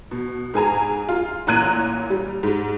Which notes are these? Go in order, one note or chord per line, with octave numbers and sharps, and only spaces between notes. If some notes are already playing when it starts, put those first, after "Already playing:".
B2
G#2 G#4 G#5 A#5
F4
A1 A#2 A#5 F#6 G#6 D#7
G3
G#2